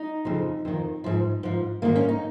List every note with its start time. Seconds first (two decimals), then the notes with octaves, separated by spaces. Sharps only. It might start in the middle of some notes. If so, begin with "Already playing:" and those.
Already playing: D#4
0.25 F2 C#3 F3
0.65 F2 D#3
1.04 G#2 F3
1.43 G#2 F3
1.82 G#2 D#3 A#3
1.96 C#4
2.09 D#4